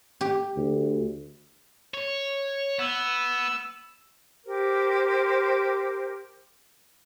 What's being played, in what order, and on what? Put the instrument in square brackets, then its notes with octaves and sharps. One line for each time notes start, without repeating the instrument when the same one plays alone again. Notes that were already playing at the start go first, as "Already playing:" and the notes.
[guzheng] G4
[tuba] D2
[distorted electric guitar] C#5
[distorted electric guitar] B3 [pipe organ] E6
[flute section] G4 A#4 C5